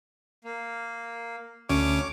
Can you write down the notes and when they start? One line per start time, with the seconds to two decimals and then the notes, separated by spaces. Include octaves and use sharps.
0.44 A#3
1.69 D2 C#4 C#5 D6